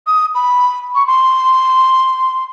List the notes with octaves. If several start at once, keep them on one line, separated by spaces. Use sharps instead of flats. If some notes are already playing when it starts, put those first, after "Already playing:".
D#6
B5
C#6
C6